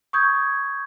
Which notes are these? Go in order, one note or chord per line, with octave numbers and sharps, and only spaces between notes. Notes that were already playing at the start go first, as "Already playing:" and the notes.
C#6 D#6 G6 G#6